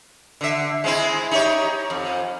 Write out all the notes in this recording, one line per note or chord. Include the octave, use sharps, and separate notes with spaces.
D3 E5
G#3 C4 E4
D#4 G4 C#5
F2